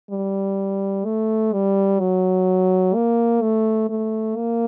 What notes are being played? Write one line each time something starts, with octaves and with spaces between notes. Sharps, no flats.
G3
A3
G3
F#3
A#3
A3
A3
A#3